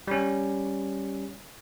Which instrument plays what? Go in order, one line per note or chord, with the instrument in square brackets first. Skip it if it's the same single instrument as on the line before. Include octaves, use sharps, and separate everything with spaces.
[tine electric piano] G3 C#4